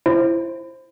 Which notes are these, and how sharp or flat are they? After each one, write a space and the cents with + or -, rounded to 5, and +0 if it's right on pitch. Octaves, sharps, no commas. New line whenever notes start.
E4 +25 C5 +10